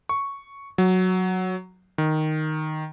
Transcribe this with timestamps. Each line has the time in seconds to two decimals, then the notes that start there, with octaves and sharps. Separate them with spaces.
0.09 C#6
0.78 F#3
1.98 D#3